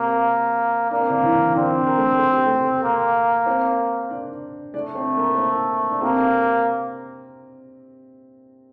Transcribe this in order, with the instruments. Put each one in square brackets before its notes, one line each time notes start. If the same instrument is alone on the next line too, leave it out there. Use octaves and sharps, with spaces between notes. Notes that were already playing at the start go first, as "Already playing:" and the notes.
Already playing: [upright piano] C3 C4 [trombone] A#3
[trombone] A#3 [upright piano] D4
[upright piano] C4
D3 D4
E3 E4
[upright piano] D3 D4 [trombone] C4
[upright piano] A#4
A3 A4
A4
G4
A3 A4
[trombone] A#3
[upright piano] C4 C5
D4 D5
[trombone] A3 [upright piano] D4 D5
[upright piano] C4 C5
A#3 A#4
C5
A#3 A#4
D4
[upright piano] C3 C4 [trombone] A#3